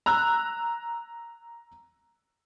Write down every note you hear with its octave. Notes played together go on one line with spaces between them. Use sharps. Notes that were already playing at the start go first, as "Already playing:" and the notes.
A#5 E6 F#6